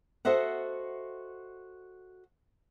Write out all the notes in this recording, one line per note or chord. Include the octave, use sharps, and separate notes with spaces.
F#4 A4 C5 D#5 E5 F#5